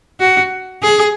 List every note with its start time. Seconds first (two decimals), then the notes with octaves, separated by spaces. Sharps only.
0.20 F#4
0.83 G#4